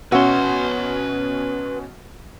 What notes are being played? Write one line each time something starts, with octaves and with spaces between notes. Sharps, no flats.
B2 C#4 F#4 B4 E5 C6